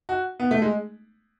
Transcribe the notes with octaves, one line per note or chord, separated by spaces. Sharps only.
F#4
B3
A3
G#3